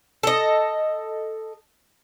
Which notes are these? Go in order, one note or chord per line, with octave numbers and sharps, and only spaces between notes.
A4 D#5